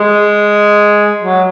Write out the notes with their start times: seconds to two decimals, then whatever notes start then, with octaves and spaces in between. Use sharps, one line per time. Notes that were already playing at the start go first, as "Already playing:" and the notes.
Already playing: G#3
1.22 F#3